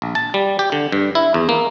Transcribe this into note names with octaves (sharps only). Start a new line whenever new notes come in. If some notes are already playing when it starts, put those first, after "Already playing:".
A#1
A5
G3
G4
D3
G2
E4
E2
A#3